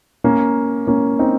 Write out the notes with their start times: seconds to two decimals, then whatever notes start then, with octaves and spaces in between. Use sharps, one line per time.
0.24 A#3 C#4
0.87 A#3 C#4
1.19 C4 D#4